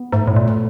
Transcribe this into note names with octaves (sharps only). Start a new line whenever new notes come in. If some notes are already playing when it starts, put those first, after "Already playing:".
Already playing: B3
G#2 A3
A2
A#2
A3